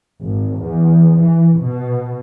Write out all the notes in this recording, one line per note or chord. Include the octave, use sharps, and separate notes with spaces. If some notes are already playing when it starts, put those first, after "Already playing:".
G#1
E2
E3
B2